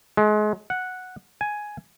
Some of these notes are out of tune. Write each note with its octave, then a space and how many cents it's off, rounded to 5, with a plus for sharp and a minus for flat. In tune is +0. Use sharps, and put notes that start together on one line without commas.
G#3 +30
F#5 -5
G#5 +5